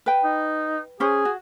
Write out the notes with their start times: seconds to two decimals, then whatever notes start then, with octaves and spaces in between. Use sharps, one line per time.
0.06 B4 G5
0.24 D#4
1.00 C#4 G#4 C5
1.25 F#4